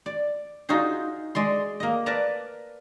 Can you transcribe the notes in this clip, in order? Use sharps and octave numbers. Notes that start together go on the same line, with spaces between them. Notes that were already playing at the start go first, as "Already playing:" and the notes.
D5
D#4 F4 F#4 G#4 C5
G#3 D5 C6
A#3 D#5
A#4 B4 D5 A5 A#5